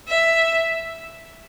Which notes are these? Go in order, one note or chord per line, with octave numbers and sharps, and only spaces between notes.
E5